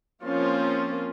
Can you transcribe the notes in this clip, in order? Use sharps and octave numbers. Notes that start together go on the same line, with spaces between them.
F3 A#3 C4 C#4 F4